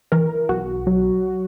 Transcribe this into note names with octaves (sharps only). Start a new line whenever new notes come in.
E3 A#4
B1 F#4
F#3